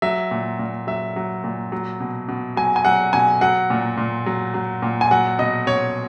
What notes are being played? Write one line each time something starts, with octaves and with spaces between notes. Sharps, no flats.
F#3 E5
A#2
A#2
F#3 E5
F#3
A#2
F#3
B2
B2
F#3 G#5
G#5
F#3 F#5
B2 G#5
F#3 F#5
A#2
A#2
F#3
F#3
A#2
G#5
F#3 F#5
B2 D#5
B2 C#5